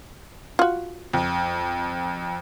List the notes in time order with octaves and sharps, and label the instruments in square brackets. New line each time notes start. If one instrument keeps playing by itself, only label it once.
[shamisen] F4 F#4
[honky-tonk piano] F2